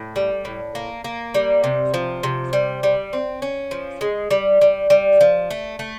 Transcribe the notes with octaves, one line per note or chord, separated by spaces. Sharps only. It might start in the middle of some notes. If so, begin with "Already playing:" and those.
Already playing: A2
G3
A2
A#3
A#3
G3
C3
F3
C3
G3
G3
C4
C#4
F3
G#3
G3
G3
G3
F3
A3
A3